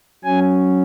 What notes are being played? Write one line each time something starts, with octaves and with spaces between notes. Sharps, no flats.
F#3 C#4 G#5